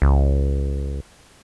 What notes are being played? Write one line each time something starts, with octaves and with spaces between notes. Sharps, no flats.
C#2